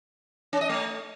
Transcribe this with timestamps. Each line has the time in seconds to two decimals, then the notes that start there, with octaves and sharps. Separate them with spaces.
0.53 C#4
0.61 D#5
0.69 A3